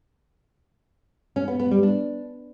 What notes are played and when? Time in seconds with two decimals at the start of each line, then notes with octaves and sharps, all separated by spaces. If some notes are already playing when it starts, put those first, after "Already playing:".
1.36 C#4
1.48 B3
1.59 B3
1.71 G3
1.83 D4